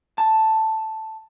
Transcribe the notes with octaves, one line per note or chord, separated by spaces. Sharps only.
A5